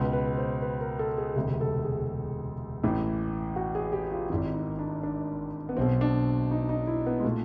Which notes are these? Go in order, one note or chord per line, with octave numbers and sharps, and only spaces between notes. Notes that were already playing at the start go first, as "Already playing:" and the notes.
Already playing: C#2 B2 B4
B4
C5
B4
A#4
A4
G#4
E1 D2 C3 G4
A4
G#4
A1 A2 E3
F#4
G#4
G4
F4
G#1 G#2 D#3 E4
D#4
D4
D4
B3
B1 B2 C4
D4
D#4
D#4
E4
B3
G#3
A#2 A3